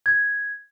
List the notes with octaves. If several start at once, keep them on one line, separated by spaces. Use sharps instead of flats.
G#6